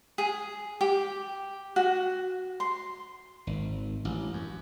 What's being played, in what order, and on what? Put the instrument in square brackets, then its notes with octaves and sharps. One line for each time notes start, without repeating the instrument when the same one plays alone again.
[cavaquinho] G#4
G4
F#4
C6
[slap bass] G#1
A1
F#2